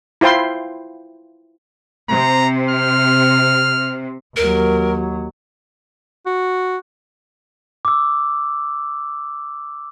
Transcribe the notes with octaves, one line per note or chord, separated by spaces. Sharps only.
E4 F4 C5 G5 C6
C3 A#5
F6
D#2 F#3 A#4
F#4
D6 E6